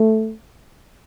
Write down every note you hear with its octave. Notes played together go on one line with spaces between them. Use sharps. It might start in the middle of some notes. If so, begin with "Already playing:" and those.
Already playing: A3